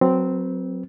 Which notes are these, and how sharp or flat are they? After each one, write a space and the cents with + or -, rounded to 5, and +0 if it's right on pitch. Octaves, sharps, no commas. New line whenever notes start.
F#3 +0 C4 -5 B4 -35